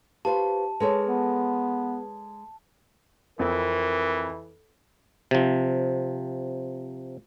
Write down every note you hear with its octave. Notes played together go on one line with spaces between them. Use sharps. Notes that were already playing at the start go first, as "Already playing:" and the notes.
F4 G4 B4 C5 A5
G#3 G#4 A4 B4 C#5
B3
F2 E3 C4 A#4
C3 F3